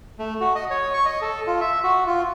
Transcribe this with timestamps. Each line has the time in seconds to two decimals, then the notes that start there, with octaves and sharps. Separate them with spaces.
0.19 A3
0.41 F#4
0.55 D#5
0.70 C#5
0.94 C#6
1.05 D#5
1.22 A4
1.47 F4
1.61 E5
1.84 F#4
2.07 F4